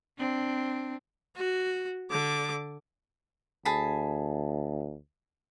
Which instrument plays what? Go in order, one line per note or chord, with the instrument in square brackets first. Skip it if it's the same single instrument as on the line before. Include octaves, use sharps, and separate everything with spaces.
[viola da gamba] C4 D4
[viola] F#4
D3 D6
[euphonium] D2 [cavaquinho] G#4 A5 B5